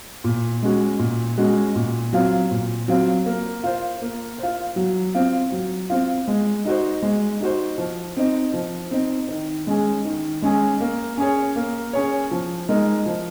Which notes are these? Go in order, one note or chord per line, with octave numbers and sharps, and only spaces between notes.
A#2
G#3 C#4 F#4
A#2
G#3 C#4 F#4
A#2
F#3 C4 F4
A#2
F#3 C4 F4
A#3
F4 C5
A#3
F4 C5
F#3
C4 F4
F#3
C4 F4
G#3
D#4 F#4 C5
G#3
D#4 F#4 C5
F3
C4 D#4
F3
C4 D#4
D#3
G#3 C#4 G#4
D#3
G#3 C#4 G#4
A#3
C#4 G#4 C#5
A#3
C#4 G#4 C#5
F3
G#3 D#4 A#4
F3